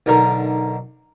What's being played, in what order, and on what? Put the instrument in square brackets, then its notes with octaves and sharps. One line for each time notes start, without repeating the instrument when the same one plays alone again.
[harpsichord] B1 D3 D#3 A#4